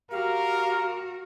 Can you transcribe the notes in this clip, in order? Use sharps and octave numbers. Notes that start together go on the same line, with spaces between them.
F#4 G4 A#4 F5